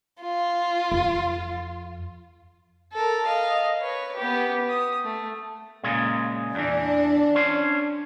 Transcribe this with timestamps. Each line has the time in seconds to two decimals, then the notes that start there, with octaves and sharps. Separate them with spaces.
0.21 F4
0.92 F2
2.93 A4 A#4
3.26 D#5 F5
3.81 B4 C#5
4.16 B3 G4
4.69 D#6
5.04 A3
5.83 A#2 C#3 G#3
6.55 E2 E3 D4
7.35 C#4 C5